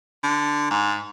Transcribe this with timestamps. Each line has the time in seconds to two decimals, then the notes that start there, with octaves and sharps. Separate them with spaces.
0.24 D3
0.71 G#2